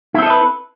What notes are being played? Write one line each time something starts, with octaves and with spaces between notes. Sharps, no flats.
C4 E4 A4 B4 D#5